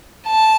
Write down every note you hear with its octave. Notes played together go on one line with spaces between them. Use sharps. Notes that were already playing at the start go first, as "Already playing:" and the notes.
A5